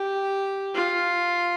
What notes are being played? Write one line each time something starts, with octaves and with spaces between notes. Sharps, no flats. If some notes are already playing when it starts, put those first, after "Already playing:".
Already playing: G4
F4